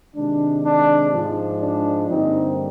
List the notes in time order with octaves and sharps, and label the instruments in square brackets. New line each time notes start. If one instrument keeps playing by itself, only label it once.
[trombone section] C3 D#3 G#3 D4
D4
G#2 F3 G#3
D4
G2 D3 G3 A#3 C4 D#4